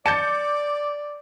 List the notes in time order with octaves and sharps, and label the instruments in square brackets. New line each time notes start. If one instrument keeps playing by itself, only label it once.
[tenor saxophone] D5 [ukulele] A5 [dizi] D6 [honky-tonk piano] G6 A6 C#7